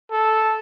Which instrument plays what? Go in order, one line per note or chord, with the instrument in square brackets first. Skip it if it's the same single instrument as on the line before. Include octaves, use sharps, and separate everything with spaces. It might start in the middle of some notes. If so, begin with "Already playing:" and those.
[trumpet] A4